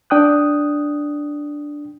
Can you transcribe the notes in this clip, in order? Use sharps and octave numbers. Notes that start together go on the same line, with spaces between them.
D4 G5 D#6 F#6